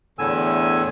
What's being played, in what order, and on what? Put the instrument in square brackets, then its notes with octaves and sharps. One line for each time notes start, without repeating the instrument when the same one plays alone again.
[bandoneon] E2 A2 D3 G#5 E6